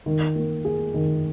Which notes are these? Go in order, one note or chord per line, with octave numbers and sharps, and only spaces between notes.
D#3
A#3
G#4
D#3